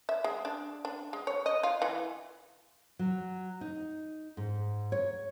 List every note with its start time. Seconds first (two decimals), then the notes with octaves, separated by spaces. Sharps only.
0.09 E5
0.24 G#3
0.45 D4
0.85 D4
1.13 G#3
1.27 C#5
1.46 D#5
1.63 F4
1.82 E3
2.99 F#3
3.61 D#4
4.37 G#2
4.92 C#5